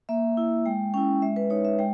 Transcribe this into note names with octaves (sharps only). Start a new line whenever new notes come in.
A#3 E5
E4
G#3 G5
C#4 E4 G5
G#3 E5
B4
D#4 C#5
E5
G#3 G5